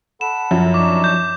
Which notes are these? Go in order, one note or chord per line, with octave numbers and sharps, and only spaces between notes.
A4 F#5 B5 E7
F#2 F3
D4 D#4 C#6 D6
G6